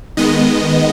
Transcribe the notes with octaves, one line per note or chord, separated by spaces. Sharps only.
D#3 G#3 B3 D#5